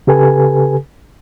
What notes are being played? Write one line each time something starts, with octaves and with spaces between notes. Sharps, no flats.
C#3 G4 A4 B4 G#5